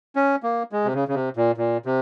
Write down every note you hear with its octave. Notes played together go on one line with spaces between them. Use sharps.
C#4
A#3
G#3
C3
C#3
C#3
C3
A#2
A#2
C3